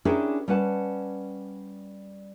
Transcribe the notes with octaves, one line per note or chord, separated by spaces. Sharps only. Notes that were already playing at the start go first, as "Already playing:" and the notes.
C#4 D4 E4 G4 G#4 A#4
G3 C#4 B4 F#5 A5